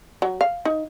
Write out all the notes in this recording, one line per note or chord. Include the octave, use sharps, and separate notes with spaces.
F#3
F5
D#4